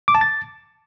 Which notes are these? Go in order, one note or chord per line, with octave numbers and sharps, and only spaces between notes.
D6
A5
A6